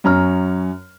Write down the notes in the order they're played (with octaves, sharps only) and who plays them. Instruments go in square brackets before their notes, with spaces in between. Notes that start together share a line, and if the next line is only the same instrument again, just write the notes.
[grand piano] F#2 C#4 A#5 F6